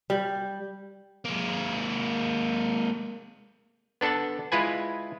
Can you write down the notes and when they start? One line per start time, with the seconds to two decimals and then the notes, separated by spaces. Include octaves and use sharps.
0.10 G3
1.25 G#3 A#3
4.01 B3 D4 A4 F#5 A5
4.52 G#3 E4 F4 B4 G#5